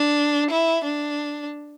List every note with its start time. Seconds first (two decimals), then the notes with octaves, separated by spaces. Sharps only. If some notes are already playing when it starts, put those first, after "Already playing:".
Already playing: D4
0.51 E4
0.84 D4